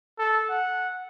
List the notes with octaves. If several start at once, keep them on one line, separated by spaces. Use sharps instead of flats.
A4
F#5